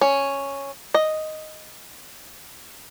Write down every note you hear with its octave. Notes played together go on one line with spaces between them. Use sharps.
C#4
D#5